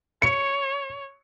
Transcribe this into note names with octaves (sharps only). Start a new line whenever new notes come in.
C#5 C#7